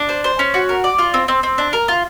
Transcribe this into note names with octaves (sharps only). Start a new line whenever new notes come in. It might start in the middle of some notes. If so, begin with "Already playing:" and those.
Already playing: D4
C5
C5
C#4
F#4
A#4
D5
F4
C4
C4
C4
D4
A#4
F4